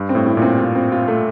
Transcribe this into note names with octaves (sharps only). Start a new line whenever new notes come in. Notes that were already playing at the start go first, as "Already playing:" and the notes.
Already playing: G2
C4
A2
E4
A#2 C4
F4
C4
F4
A3